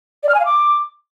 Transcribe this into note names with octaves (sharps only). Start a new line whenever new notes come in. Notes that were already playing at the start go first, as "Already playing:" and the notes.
D5
F6
G#5
F5
D6